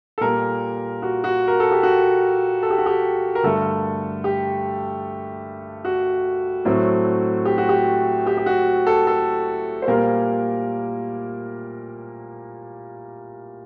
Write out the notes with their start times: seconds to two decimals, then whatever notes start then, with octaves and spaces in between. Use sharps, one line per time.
0.18 A4
0.21 A#2 G3 A#3 A#4
1.02 F#4
1.24 F#4
1.48 A#4
1.60 A4
1.71 G4
1.83 F#4
2.63 A4
2.70 G4
2.78 F#4
2.86 G4
3.35 A#4
3.43 G2 D3 A3 A4
4.24 G4
5.85 F#4
6.65 A2 F#3 A3 C4
7.45 G4
7.58 F#4
7.69 G4
8.27 G4
8.37 G4
8.46 F#4
8.87 A4
9.07 A4
9.82 C5
9.87 A#2 G3 A#3 A#4